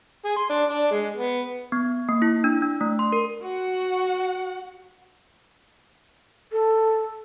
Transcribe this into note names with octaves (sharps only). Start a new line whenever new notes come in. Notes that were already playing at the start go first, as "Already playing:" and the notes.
G#4
C6
D4
D4
G#3
B3
B3
A#3
E4
D4
D4
A3
C6
A#4
F#4 F#5
A4